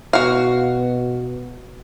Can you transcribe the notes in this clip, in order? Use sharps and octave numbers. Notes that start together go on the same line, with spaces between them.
B2 F#4 F5